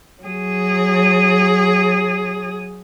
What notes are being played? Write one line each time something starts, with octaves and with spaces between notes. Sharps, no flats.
F#3 G#4